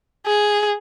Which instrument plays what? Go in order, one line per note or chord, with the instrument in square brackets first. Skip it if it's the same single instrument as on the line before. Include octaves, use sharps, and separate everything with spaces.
[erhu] G#4